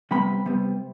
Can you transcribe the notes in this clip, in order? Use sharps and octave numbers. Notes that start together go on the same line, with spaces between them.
C3 G3 B3 B5
C3 G3 B3